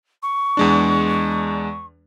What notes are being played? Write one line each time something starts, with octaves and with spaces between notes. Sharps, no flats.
C#6
E2 G#3 D4